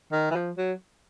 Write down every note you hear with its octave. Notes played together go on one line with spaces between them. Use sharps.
D#3
E3
F3
F#3